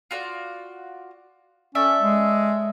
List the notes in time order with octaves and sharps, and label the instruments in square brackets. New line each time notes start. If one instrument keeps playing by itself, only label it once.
[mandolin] F4 F#4 D5
[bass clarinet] C#4 [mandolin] A4 D5 E5
[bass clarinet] G#3